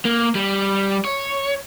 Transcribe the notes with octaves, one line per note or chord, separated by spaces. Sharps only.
A#3
G3
C#5